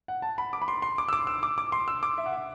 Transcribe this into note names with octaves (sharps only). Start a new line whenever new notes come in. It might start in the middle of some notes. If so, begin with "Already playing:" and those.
F#5
A5
B5
D6
B5
C6
C6
D6
E6
D6
E6
D6
D6
C6
E6
D6
E5
F#5
E5